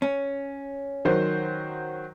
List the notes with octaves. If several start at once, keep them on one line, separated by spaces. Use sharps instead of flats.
C#4
D#3 F#3 C5